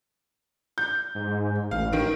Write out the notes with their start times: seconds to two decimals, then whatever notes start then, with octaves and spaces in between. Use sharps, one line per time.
0.78 G6
1.15 G#2
1.71 A1 F5
1.93 D#3 D7